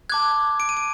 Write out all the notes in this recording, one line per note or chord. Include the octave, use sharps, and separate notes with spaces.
A5 D6 F#6 G#6
D7
D#7
D7